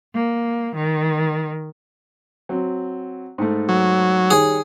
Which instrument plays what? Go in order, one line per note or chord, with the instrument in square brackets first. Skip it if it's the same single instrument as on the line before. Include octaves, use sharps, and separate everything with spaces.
[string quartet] A#3
D#3
[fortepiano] F#3 C4
G#2 A3
[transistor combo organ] F#3
[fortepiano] D#3 G3 C#5 [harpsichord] G#4